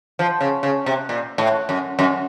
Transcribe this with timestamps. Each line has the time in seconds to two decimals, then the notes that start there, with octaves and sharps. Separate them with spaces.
0.19 F3
0.41 C#3
0.63 C#3
0.86 C3
1.09 A#2
1.38 A2
1.69 F#2
1.99 F#2